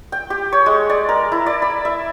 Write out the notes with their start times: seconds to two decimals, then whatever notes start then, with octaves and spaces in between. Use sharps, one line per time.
0.12 G5
0.30 G4
0.52 C#5
0.66 G#3
0.90 D5
1.09 A#4
1.32 E4
1.46 D5
1.62 B5
1.85 E5